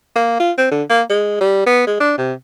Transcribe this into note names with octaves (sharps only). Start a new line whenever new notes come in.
A#3
F4
C4
D3
A#3
G#3
G3
B3
G#3
D4
C3